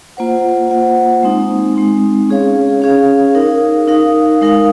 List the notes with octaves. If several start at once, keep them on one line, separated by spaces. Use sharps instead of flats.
A#3 F4 C5 F#5
A#3 F4 C5 F#5
G#3 C4 D#4
G#3 C4 D#4
C#4 G#4 C#5 F5
C#4 G#4 C#5 F5
D#4 A#4 F5
D#4 A#4 F5
G#3 D#4 A#4 F5